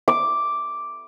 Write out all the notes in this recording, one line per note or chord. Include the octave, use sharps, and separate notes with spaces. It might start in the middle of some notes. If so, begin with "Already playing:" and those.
D6